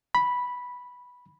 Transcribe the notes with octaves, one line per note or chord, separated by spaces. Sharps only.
B5